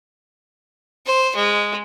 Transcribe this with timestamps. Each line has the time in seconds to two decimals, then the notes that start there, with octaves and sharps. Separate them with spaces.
1.06 C5
1.35 G#3